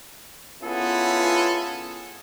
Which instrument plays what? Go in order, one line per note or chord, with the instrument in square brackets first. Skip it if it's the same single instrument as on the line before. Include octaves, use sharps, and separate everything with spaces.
[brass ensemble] B3 C#4 E4 F4 G#4 A4